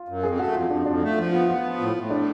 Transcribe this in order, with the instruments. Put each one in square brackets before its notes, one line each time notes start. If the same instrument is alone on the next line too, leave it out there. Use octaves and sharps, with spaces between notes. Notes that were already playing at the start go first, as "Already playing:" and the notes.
Already playing: [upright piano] F4
[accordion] F#2
[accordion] F2 [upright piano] G#4
[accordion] A3 [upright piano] F#4
[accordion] F2 [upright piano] F4
[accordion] F2 [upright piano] D4
[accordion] F2 [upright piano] D4
[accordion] A3 [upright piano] F4
[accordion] F3
[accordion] B3 [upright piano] F4
[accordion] B3 [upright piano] F4
[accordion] F3
A2
A2
[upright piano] D4